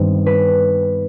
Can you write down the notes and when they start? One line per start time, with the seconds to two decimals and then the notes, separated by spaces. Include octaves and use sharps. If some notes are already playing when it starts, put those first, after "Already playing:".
Already playing: G2 D#3 G3 B3 C4
0.26 B4